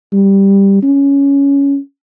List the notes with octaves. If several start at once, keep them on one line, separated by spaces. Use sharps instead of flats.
G3
C#4